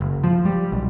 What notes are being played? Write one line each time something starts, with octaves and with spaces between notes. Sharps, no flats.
F#1
F3
G3
B1